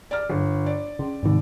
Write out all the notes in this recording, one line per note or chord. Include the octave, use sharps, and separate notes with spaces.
D5 F6
G1
D5
C#3
G#2 C3 D#3